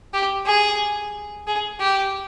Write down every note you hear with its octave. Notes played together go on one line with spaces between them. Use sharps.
G4
G#4
G#4
G4